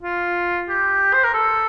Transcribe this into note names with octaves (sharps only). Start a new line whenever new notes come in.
F4
G4
C5
A#4
A4